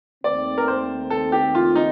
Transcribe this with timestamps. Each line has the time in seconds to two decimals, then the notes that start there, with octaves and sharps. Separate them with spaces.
0.24 D#2 D#3 A3 C4 D5
0.58 A#4
0.68 C5
1.10 A4
1.32 G4
1.55 F4
1.75 D#4